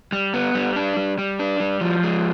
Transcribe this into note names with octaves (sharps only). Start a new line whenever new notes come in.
G3
B3
G3
D4
G3
G3
D4
G3
F3
G#3